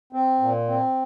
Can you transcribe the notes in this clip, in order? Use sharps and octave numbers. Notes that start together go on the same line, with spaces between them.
C4
A#2
C4